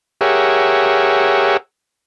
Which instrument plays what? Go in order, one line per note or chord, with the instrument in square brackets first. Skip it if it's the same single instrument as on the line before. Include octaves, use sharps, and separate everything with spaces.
[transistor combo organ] G4 G#4 A#4 C#5 E5 F#5